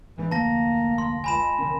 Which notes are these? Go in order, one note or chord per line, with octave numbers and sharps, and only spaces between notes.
G2 E3 G#3 D4
F1 D2 A#3 A5 A#6
C6
C#2 G#5 B5 E7
E1 C#2 D#3 C#4